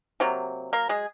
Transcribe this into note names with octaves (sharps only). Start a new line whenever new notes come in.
C3 F#3 A#3
A#3 A#4
G#3 G#4